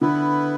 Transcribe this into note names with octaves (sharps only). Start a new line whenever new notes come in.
D3 B3 E4 B4